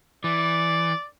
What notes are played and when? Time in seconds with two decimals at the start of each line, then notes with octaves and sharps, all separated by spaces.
0.24 E3 D5